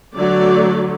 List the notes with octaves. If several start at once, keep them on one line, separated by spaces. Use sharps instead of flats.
D3 F#3 A3 D5